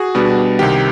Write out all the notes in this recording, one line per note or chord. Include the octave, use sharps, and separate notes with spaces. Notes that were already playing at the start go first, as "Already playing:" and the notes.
Already playing: F#4 G#4
B2 G3 B3 D4
C2 C3 D#3 G4